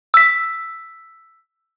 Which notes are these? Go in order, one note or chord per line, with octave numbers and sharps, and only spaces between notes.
E6 B6